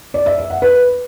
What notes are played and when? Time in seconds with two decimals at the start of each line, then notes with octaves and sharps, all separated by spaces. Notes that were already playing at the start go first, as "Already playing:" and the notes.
0.14 D5
0.26 E5
0.38 E5
0.50 F#5
0.62 B4